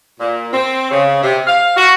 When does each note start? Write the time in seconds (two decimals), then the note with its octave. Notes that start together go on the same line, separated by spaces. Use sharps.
0.20 A#2
0.53 C4
0.91 C#3
1.22 C3
1.47 F5
1.76 F#4